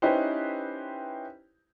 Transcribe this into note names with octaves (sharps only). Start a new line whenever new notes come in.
C#4 D#4 E4 G4 B4 C5